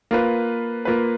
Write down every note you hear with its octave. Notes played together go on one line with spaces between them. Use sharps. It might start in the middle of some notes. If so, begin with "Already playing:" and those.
A#3 F4 B4
A#3 F4 B4